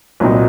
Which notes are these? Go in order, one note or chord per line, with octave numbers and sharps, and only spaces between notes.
C2 A#2 F#3 C4 D#4